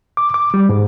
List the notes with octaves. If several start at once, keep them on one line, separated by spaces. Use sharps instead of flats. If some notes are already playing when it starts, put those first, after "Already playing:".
D6
D6
G3
G#2